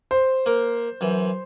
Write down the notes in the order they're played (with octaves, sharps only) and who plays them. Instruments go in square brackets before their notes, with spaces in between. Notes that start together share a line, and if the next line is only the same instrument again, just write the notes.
[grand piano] C5
[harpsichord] A#3 A#4
F#2 E3